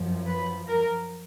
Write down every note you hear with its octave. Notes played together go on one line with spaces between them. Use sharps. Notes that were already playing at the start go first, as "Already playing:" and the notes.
Already playing: F#2 F3
B4
A#4